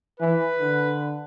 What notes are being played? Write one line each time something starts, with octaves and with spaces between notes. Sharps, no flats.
E3 B4
D3